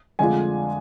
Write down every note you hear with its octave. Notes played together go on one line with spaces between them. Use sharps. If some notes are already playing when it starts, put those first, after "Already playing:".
F2 D3 G#3 D4 F4 G#5